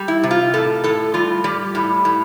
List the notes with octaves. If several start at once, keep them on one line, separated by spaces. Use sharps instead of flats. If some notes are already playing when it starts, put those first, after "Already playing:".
Already playing: G3
E4
C3
F4
A2 A4
A2 A4
G3 F4
G3 G4
A2
A2